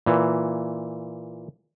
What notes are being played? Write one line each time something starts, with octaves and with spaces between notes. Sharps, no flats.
A#2 E3